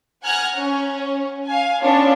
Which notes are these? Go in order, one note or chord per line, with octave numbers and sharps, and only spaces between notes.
F#5 G#5 A#5 F6 F#6 G#6
C#4
F5 G#5
B3 C#4 D4 F4 C#5